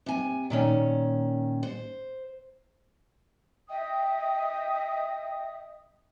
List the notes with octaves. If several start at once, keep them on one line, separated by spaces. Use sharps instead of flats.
C3 G#5
A#2 D#3 C#4
C5
D#5 E5 G5 D#6